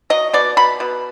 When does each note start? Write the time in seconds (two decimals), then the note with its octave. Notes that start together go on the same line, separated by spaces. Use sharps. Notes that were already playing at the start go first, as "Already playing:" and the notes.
0.10 F#3 D#5
0.33 B2 D5
0.57 B2 B5
0.80 B2